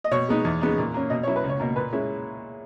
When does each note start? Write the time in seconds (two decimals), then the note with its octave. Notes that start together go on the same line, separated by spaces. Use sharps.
0.04 D#5
0.11 B2 C#5
0.29 G#3 B3 D#4
0.44 E2
0.61 C#3 G#3 B3 D#4
0.78 A#2
0.94 A#3 C#4
1.10 B2 D#5
1.23 F#3 C#4 E4 C#5
1.36 B4
1.44 C#2
1.49 C#5
1.60 B2 A#3
1.76 A#2 B4
1.93 G#3 C#4 E4